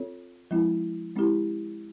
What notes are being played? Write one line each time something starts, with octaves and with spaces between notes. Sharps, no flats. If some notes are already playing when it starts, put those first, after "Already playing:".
Already playing: C4 F4 A4 C#5
F3 G#3 C4 E4
G#3 C4 E4 G4